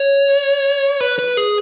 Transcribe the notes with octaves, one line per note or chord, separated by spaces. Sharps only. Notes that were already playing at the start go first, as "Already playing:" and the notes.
Already playing: C#5
B4
B4
G#4